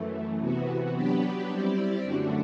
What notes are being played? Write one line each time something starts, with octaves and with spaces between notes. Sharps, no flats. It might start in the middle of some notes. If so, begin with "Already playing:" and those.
Already playing: F#2 E3 A3
C3 E3 B3 F#4
F#3 B3 D4 G4 B4
G3 C4 E4 G4 D5
F#2 D3 A3 D4 F#4